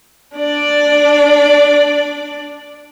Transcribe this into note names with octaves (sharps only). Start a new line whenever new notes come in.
D4 D5